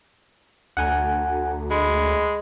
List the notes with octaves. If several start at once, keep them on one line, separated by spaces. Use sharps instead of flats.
D2 F#5 G#5 A#5
G#3 B5